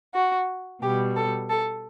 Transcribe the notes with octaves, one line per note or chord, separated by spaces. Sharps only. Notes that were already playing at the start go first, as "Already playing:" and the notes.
F#4
B2 G3 G4
A4
A4